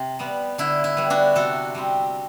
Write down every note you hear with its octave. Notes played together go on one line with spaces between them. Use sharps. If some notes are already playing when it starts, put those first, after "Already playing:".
Already playing: C3
G3 B3
D3 E4
E4
G3 B3
D4 F#4
C3 F#4 A4
G3 C4